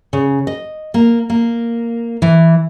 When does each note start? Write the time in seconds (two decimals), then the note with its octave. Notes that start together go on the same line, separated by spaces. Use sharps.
0.13 C#3
0.47 D#5
0.94 A#3
1.30 A#3
2.22 E3